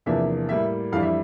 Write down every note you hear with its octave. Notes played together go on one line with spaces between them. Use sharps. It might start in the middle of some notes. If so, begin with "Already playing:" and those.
E2 C3 F3 A#3 D4 E5
A2 G3 A#3 E5
F2 E3 G3 D4 F5
E5